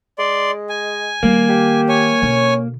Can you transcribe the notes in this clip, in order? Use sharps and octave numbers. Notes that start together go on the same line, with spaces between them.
G#3 D5 C6
G#5
D#3 G3 A#3
G4
C#5 G#5
B2 D3 C#4